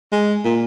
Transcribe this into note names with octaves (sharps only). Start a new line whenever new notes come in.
G#3
A#2